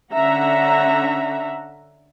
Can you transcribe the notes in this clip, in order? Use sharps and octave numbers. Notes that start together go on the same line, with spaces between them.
D3 C#4 E5 F#5 A#5